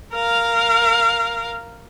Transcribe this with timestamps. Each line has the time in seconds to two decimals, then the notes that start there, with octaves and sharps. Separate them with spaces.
0.14 A#4 F5